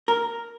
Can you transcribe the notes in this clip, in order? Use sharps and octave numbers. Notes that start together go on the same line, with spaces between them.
A#4